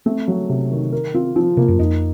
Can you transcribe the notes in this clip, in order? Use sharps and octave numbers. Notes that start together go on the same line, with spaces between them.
A3 C4
F#3
C3
D#3
A#4
C4 F4
F3 C4
C3 A#3
F#2
F2 D#4